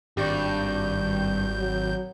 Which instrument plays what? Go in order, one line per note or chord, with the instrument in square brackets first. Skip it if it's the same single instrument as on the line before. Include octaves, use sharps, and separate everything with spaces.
[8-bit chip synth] G#1 G6 [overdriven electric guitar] G2 [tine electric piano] G4 D5 C#6
[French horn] F#3